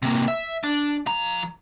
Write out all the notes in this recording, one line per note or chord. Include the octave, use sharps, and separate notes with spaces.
C3 A#3
E5
D4
F3 A#5